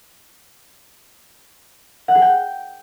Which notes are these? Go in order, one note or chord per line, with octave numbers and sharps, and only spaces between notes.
F#5
G#4
G5